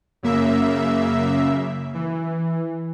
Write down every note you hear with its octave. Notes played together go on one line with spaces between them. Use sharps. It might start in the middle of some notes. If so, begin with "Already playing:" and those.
F#2 C#3 A#3 E5
E3